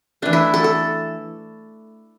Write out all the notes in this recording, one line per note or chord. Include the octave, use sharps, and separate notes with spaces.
E3 A3 D4
E4
A4
A4